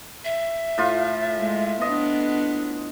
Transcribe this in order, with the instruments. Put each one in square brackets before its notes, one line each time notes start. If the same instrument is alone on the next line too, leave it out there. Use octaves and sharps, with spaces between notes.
[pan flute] E5
[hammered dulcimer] A2 F4
[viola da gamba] G#3
[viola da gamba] B3 D4 [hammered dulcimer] D#5